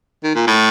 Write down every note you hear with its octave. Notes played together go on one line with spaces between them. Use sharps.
D#3
A#2
A2